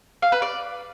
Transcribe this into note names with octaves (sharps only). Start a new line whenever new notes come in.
F5
B4
D5